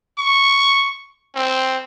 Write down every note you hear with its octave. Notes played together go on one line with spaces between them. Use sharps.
C#6
C4